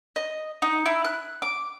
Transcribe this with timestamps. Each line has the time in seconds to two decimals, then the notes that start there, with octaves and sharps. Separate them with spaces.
0.16 D#5
0.62 D#4
0.86 E4
1.05 F#6
1.42 D6